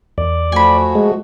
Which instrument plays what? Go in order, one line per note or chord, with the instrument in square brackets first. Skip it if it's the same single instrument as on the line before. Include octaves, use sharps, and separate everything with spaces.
[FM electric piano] E2 [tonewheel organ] D5
[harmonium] F3 A3 F#4 [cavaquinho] G#5 B5
[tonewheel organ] G#3